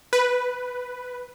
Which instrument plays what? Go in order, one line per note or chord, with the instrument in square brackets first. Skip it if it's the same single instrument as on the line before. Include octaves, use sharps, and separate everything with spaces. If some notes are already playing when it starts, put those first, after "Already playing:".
[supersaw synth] B4